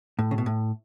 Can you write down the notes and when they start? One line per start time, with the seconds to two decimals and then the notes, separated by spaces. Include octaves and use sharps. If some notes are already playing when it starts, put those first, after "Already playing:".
0.19 A2
0.31 C#3
0.38 B2
0.46 A2